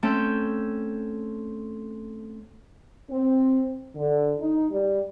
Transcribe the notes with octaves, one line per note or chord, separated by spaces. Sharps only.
A3 C4 C#4 A4 G5 G6
C4
D3
D#4
G3